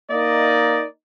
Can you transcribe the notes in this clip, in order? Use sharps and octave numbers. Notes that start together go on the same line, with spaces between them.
A#3 D#4 D5 D#5